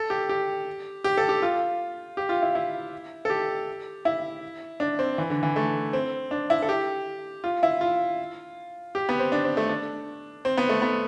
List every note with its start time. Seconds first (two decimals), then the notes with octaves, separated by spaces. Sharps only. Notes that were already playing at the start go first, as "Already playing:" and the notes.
Already playing: A4
0.10 G4
0.29 G4
1.04 G4
1.17 A4
1.29 G4
1.42 F4
2.17 G4
2.29 F4
2.42 E4
2.55 E4
3.25 A4
3.30 G4
4.05 E4
4.80 D4
4.99 C4
5.18 E3
5.30 D3
5.43 E3
5.56 A3
5.93 C4
6.31 D4
6.50 E4
6.62 A4
6.69 G4
7.44 F4
7.63 E4
7.81 F4
8.95 G4
9.09 B3
9.20 C4
9.32 D4
9.44 C4
9.57 A3
9.69 D4
10.45 C4
10.57 B3
10.69 A3
10.82 B3